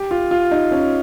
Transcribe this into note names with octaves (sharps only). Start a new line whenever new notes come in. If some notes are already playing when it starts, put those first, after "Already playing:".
Already playing: G4
F4
F4
D#4
C#4